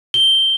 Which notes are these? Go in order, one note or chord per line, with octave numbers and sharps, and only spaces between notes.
G7